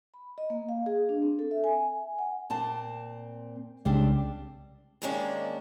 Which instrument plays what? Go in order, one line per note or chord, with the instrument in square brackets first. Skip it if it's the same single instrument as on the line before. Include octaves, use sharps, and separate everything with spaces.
[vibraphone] B5
D#5
A#3
F5
G#4
D4
C4
A4
E5
G#5
F#5
[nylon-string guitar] A#2 C4 A5
[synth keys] C2 C#3 G#3 [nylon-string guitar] G3 C4 D4
[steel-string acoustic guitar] D#2 G#2 G#3 A#3 C#4 D4